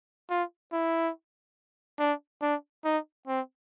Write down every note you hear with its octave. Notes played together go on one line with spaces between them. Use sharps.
F4
E4
D4
D4
D#4
C4